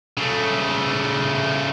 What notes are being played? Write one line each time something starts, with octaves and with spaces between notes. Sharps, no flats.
C#3 A3